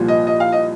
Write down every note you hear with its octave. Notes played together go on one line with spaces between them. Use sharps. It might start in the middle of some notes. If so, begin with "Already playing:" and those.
Already playing: C2 A#2 F3
D#5
D#5
F5
D#5